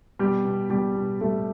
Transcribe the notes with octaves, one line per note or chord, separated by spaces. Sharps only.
B2 G3 G4
B2
B2 G3 G4
B2
G3 A3 A4